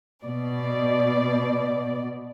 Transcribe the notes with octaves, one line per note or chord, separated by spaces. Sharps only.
B2 D5